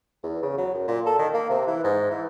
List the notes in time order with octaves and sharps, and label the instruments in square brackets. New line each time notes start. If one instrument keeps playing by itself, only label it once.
[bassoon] E2
C#3
F#3
F#2
A#2
A4
D#3
A#3
C3
E3
G#2
E3